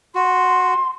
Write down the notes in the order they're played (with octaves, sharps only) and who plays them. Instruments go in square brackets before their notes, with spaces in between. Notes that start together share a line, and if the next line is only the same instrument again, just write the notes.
[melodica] F#4 [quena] C6